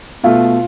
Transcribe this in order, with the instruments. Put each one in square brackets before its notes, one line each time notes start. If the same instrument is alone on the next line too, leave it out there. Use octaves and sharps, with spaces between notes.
[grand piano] B2 A3 F4